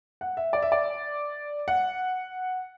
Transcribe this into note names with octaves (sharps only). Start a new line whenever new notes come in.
F#5
E5
D5
E5
D5
F#5